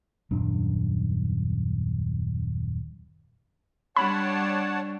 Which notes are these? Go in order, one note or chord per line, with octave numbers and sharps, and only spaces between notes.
D#1 F#2 D4
G3 D4 C#5 F#5 A5 B5